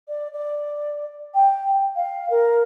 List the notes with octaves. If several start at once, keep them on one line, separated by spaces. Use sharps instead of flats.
D5
D5
G5
F5
A#4